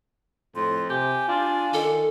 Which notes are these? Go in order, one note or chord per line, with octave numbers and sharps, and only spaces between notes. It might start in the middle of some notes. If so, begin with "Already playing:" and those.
F2 A2 C6
C3 G4 G#5
D4 F4
D#3 A4